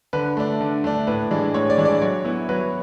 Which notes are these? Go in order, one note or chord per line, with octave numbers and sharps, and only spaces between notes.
D3 B4
A3 D4
D3
A3 D4
A2 B4
E3 G#3 D4
A2 C#5
D5
E3 G#3 D4
D5
F#3 C#5
B3 E4
F#3 B4